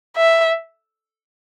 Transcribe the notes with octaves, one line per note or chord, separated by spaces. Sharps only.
E5